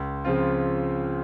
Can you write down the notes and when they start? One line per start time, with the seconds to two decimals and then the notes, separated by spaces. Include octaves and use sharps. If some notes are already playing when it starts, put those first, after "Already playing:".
Already playing: C#2
0.24 C#3 F3 C4 F4